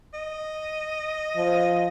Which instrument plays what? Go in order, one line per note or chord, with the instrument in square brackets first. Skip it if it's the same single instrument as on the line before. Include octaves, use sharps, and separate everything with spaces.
[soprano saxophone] D#5
[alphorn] F3